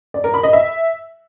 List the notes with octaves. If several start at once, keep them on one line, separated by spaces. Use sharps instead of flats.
D5
A#4
B5
D#5
E5